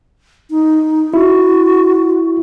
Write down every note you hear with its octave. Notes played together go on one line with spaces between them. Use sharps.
D#4
E4 F#4